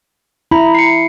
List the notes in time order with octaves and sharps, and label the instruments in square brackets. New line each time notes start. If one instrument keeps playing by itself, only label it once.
[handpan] E4 [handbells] A#5 B5
[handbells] C7 C#7